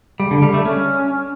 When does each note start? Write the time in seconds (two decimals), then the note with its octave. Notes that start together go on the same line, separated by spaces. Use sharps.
0.20 G3
0.31 D3
0.42 G3
0.54 A3
0.65 C#4